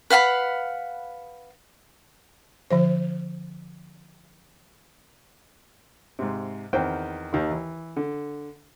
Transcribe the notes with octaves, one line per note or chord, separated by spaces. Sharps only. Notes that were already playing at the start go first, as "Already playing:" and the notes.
B4 F5 F#5 B5
D3 F3 C5
G#2 C3
E2 D#3 C4 C5 G5
D#2 D#3
E3
D3